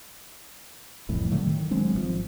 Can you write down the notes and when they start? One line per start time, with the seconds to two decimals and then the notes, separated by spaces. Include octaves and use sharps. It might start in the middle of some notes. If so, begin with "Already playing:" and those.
1.09 C2 F2 A2 E3
1.31 A2 D3 F#3 A3
1.42 D#3
1.71 F#3 G#3 C4 D4
1.93 G#1 D#3 F3